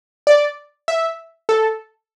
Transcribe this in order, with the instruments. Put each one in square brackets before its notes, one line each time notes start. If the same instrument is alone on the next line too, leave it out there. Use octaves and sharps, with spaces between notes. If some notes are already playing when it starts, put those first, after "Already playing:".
[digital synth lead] D5
E5
A4